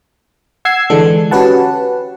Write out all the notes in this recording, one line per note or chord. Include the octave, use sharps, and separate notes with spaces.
F#5 E6 G#6 C7
D3 E3 G#3 D4 A4
C#4 F#4 G4 B4 F#5 A5